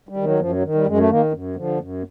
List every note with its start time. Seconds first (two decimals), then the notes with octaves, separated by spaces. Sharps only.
0.09 G3
0.17 D#3
0.24 F#3
0.39 F#2 F3
0.51 F#3
0.63 D#3
0.75 G3
0.86 F#2 G#3
0.98 A3
1.10 D#3 A#3
1.32 F#2
1.56 D3 F3
1.79 F#2